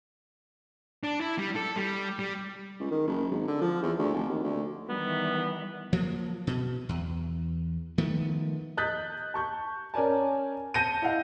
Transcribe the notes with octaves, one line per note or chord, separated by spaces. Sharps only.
D4
E4
G3
A4
G3
G3
C#2
D#3
F#1
G#1
D3
F3
E2
D2
F1
D#2
D2
D#3 E3 G3 B3
F3 F#3 A#3
B2
E2
D#3 F3 A3 B3
D#5 D#6 F#6 G6 A6 B6
A5 C#6 G6
C#4 A#4 D5 G#5 A5
A5 G6 A#6 C#7 D#7
E4 D#5 F5 F#5